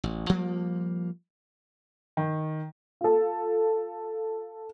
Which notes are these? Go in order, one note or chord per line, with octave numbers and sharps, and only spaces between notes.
A1
F3 G3 A#3
D#3
F4 A4